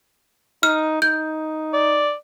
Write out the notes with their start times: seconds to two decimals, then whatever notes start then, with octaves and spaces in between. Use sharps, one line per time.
0.63 D#4 F6
1.02 D#4 G6
1.73 D5